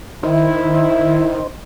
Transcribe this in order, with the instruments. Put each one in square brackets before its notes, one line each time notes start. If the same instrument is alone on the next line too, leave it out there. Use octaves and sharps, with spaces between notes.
[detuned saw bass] D#3 [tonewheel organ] D#4 C5 [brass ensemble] E4